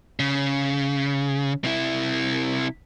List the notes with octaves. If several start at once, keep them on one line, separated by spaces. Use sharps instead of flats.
C#3
C3 E4